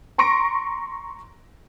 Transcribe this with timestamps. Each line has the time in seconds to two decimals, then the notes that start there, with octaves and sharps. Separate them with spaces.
0.18 A#5 C6 C#6 A#6 D7